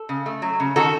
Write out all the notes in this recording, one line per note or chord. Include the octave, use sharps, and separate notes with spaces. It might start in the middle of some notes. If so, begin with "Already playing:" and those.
Already playing: A4
C#3
A3
F#3
C#3
D#3 F#4 A4